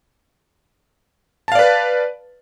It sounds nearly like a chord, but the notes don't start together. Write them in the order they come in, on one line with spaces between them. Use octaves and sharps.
A5 F5 D5 B4